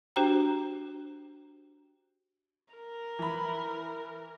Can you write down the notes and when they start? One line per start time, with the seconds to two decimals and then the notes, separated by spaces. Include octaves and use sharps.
0.16 D4 F#4 G4 C5 G5 A#5
2.74 A#4
3.19 E3 B5